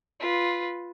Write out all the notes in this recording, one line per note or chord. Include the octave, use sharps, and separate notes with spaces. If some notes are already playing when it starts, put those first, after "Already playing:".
F4 B4